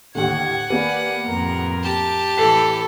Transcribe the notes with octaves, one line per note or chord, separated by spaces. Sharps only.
D#2 A2 D3 F#5 G#6
D#2 A#3 B3 B4 D5 G#5
F2 A2 A#4
G4 A5
A2 E3 A4 B6 C7 F#7